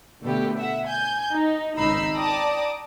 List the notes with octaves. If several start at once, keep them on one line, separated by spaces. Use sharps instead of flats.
B2 D3 A3 B3 G4
E5 F#5
G#5 G6
D#4
G#1 C#2 D#4 B5 E6 C7
D5 G5 A5 A#5 D6 D#6